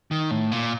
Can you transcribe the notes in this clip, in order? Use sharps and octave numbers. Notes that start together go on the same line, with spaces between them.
D#3
A2
A#2